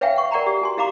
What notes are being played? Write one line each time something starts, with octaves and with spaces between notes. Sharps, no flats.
B4 C#5 E5 F5 G5 G#5
F#5 C#6
A#4 D5 F#5 G5 A#5 B5
G4 D5
F#4 G#5 C6
E4 G4 F5 A#5 B5 D6